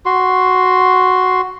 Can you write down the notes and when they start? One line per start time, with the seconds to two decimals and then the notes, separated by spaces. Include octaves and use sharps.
0.06 F#4 C6